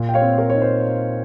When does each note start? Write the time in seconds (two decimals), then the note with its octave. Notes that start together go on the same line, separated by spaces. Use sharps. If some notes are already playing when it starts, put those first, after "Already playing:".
Already playing: A#2
0.09 G5
0.14 C#5 F5
0.22 C4
0.38 A#4 C#5
0.50 D#4 C#5
0.62 C5